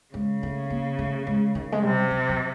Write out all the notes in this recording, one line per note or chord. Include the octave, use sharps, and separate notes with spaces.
C#3 G#3
A3
A#3
A3
G#3
D#3
G#3
C3 G3
F#3
F#3